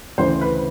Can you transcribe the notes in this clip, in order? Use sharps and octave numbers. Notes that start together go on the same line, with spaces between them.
D2 C#3 E3 C5
B4